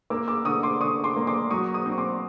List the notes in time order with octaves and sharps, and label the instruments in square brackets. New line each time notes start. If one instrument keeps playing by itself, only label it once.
[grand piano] A#3 [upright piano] D6 E6
[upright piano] D6 E6
[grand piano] D3 [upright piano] C#6 D#6
[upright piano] C6 D6
[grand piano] D3 [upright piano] C#6 D#6
[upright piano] C6 D6
[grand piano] A#3
[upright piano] C6 D6
[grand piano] F#3 [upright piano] C#6 D#6
[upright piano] C#6 D#6
[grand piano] C4
[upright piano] C#6
C6 D6